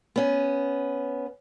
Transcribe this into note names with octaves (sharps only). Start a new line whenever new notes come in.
B3 C#4